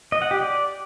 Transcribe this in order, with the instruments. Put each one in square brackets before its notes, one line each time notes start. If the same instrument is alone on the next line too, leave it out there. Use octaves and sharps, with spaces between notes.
[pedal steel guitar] D#5
F#5
G4
D5